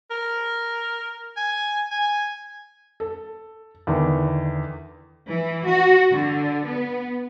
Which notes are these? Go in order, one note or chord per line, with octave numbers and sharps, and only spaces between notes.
A#4
G#5
G#5
A4
E2 D3 D#3
E3
F#4
D3
B3